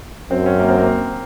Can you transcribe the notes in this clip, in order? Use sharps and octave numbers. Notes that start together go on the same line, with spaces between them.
F#2 C4
C#4
A#3
C4
A#3